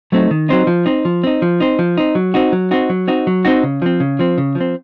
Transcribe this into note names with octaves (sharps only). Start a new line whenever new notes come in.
F#3 A3 C4 D#4
D#3
F#3 A3 C4 D#4
F3
C4 D#4
F3
C4 D#4
F3
C4 D#4
F3
C4 D#4
F#3
C4 D#4 F#4
F#3
C4 D#4 F#4
F#3
C4 D#4 F#4
F#3
C4 D#4 F#4
C#3
F3 C4
C#3
F3 C4
C#3
F3
C4